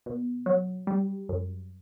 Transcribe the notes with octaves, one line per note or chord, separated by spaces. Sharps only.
B2
F#3
G3
F#2